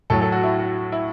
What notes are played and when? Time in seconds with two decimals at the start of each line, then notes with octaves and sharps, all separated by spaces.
0.10 A2 F#3 A4
0.21 A4
0.32 F#4
0.43 E4
0.59 F#4
0.92 E4